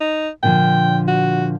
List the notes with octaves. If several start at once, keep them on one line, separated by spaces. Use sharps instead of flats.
D#4
A#2 D3 F3 G5
F#4